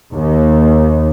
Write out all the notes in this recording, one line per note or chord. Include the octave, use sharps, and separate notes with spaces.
D#2